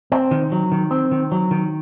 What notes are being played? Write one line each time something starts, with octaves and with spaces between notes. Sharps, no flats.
C4
D#3
F#3
D#3
C4
D#3
F#3
D#3